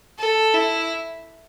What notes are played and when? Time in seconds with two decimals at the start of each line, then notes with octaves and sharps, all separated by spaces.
0.19 A4
0.54 E4